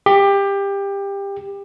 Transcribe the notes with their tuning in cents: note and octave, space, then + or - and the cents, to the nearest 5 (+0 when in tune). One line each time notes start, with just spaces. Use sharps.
G4 +20